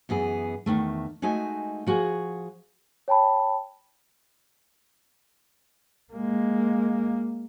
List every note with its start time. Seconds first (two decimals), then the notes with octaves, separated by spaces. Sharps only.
0.09 F#2 E3 B3 G#4
0.66 E2 G2 D#3 A3
1.22 G#3 A3 D#4 F#4 G#5
1.87 F3 F#4 G#4
3.08 C#5 G5 A5 B5
6.13 G#3 A#3